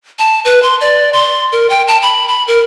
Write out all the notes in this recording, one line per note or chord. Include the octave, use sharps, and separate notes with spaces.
A5
B4
C6
D5
C6
A#4
G5
A5
B5
B5
A#4